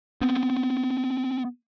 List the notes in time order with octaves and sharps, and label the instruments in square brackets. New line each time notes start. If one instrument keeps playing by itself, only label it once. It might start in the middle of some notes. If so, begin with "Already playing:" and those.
[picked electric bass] B3 C4